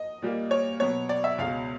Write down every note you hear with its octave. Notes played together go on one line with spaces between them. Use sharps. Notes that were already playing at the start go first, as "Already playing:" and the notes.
Already playing: D#5
A#2 G3 A#3
C#5
B2 F#3 B3 C#5
D5
E5
C#2 B2 G#3 F5